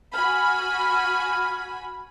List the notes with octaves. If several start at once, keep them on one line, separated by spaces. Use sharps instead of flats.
F#4 G#5 B5 F6